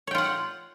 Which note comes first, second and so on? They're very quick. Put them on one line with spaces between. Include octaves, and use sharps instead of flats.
C#5 G5 F4 F#5